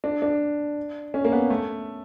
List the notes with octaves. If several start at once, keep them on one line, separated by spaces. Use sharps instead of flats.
D4
D4
C#4
A#3
B3
A3